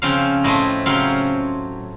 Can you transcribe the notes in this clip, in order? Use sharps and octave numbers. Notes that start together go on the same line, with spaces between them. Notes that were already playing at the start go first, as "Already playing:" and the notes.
C#3 F3 C4 F5
A2 A3 C4 D#5
C#3 F#3 C4 F5